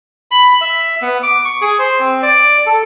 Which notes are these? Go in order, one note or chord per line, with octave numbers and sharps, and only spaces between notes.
B5
E5
B3
D6
C#6
G#4
C5
C4
D5
A4